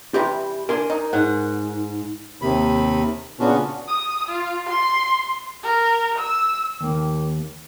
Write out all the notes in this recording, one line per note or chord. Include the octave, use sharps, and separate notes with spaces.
C3 E3 G3 G4
D4 A#4 G#5 C6
D#4
G#2 F#5
D#2 C3 D#3 B5
A#2 C#3 B3 C#4 D4 F#4
D#6
F4
C6
A#4
E6
D#2 A#3